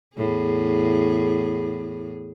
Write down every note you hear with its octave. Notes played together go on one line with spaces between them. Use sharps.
E2 A2 G#4